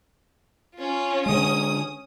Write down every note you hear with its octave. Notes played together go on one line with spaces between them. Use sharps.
C#4 F4
D3 G#3 C#4 D#6